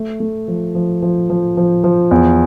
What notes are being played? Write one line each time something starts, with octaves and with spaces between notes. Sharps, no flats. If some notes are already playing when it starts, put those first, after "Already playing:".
Already playing: A3
A3
F3
F3
F3
F3
F3
F3
E2